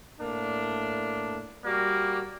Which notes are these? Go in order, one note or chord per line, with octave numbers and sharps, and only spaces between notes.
A2 A#3 D4
G3 A#3 F#4 D5